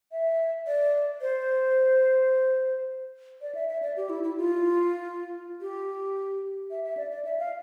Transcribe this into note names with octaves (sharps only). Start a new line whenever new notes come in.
E5
D5
C5
D5
E5
E5
D5
G4
E4
E4
F4
G4
E5
E5
D5
D5
E5
F5